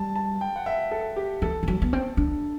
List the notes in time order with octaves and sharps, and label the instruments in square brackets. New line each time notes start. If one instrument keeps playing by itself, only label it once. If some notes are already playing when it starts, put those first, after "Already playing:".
Already playing: [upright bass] G3 [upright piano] A5
[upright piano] A5
G5
F#5
E5
A4
G4
[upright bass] E3 [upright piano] A4
[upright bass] E3
F#3
B3
C4
D4